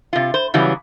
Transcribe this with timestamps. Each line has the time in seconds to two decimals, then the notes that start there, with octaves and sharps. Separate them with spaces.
0.13 C3 F4
0.34 C5
0.54 C#3 E3 F#3 G3